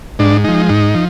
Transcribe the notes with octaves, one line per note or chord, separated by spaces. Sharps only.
G#2 D4
F3 G#3 D#4
G#2 D#4
F3